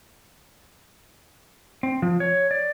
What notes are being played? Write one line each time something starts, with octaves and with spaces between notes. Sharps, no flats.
C4
F3
C#5
D5